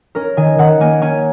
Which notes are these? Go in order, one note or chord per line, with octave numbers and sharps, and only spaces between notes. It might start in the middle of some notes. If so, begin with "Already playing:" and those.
C#4 A#4
D#3 G#5
D#3 F#5
A#3 G#5
C#4 G#5